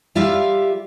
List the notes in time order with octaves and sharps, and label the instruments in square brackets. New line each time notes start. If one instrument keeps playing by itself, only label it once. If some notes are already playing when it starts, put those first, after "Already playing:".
[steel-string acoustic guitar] G3 F4 G4 E5 F5